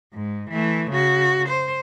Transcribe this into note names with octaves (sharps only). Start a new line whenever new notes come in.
G#2
E3 A3
C#3 F#4
C5